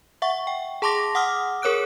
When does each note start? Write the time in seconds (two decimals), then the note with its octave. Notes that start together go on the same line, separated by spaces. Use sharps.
0.22 E5 F#5 C#6
0.47 G5
0.82 G#4 A5 C6 D6 A#6
1.15 F#5 D6 D#6 F6
1.62 G#4 A#4 C#5 D6 F#6 D7